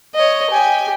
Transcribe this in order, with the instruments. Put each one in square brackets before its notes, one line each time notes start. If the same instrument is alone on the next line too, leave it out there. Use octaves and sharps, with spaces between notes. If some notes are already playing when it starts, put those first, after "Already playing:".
[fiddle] C#5 D#5
[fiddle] G4 [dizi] G#5